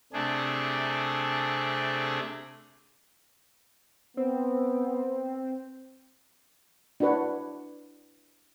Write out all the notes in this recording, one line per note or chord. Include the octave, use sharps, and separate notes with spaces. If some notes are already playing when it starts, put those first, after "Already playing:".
C3 A3 D4 G#4
B3 C4
D4 E4 F#4 B4 C#5 F#5